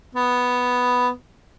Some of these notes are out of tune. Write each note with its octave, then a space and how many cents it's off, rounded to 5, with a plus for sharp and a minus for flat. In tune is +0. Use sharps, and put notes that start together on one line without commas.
B3 +0